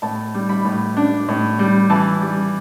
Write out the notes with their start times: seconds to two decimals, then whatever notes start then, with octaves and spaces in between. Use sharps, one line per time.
0.02 A2 A5
0.34 G3
0.49 B5
0.65 A2
0.97 D4
1.28 A2
1.59 G3
1.90 E3 A5
2.22 G3